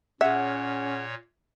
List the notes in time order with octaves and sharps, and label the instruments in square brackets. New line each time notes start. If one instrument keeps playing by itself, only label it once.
[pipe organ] A#2 C#5 [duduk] C#4 [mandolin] G#4 F#5 [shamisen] E5